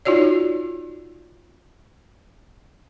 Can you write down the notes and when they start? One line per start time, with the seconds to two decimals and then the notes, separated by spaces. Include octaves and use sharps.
0.05 D#4 F4 F#4 C#5 D5